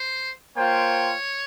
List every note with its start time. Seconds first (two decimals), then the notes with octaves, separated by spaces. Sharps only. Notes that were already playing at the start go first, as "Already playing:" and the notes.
Already playing: C5
0.56 A#3 F4 C5 C#5 G5